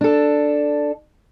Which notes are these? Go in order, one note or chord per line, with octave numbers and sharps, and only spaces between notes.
D4 A4